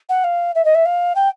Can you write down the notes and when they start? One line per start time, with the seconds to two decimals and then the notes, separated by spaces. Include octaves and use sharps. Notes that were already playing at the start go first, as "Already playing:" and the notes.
0.09 F#5
0.24 F5
0.55 E5
0.65 D#5
0.75 E5
0.85 F5
1.16 G5